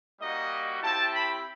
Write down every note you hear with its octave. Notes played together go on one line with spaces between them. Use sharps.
G3 A#3 D#4 F#4 D#5
C4 E4 G4 A5
B5